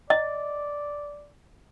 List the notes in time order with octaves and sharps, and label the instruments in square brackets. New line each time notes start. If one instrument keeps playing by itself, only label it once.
[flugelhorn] D5 [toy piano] D#5